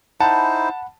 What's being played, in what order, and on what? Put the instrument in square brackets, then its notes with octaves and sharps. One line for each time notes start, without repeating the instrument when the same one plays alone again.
[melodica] D#4 E4 C5 [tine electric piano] F#5 B5 [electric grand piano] A5